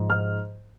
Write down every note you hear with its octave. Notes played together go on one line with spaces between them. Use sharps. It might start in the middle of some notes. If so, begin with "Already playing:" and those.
Already playing: G#2 F3
F6